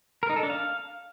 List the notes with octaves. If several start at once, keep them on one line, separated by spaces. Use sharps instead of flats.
A#4
D#4
A4
D4
F5